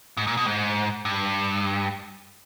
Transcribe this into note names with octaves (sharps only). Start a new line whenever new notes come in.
G#2
A#2
B2
G#2
G2